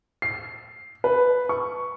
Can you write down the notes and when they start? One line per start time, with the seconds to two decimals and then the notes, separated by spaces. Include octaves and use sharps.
0.22 C7
1.04 B4
1.49 C#6